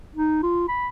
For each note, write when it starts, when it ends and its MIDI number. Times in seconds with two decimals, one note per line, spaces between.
0.16 0.41 63
0.43 0.66 65
0.68 0.88 83